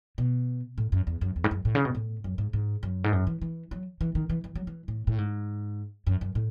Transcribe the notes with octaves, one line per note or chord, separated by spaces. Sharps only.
B2
A2
F#2
E2
F#2
E2
G#2
F#2
A2
C#3
B2
A2
F#2
G#2
G#2
F#2
G#2
F#2
E3
E3
F#3
E3
D#3
E3
E3
F#3
E3
A2
A2
G#2
F#2
F#2
A2